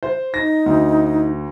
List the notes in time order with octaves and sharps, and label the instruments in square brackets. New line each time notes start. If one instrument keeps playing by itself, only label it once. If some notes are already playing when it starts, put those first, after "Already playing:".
[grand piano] C5
[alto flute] D#4 [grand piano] A#6
[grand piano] D2